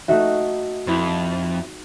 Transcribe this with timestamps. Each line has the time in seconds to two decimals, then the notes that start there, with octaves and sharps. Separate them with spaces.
0.08 A3 D#4 F#4 E5
0.87 F2 E4 B4 C5